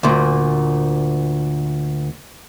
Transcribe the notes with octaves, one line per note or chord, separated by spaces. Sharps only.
D2 A#2